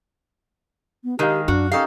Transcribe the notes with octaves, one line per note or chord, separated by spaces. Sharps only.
B3
D#3 G#3 G4 A#4 F5
F#2 D4 F#4
C#4 D#4 G4 A4 F5 G5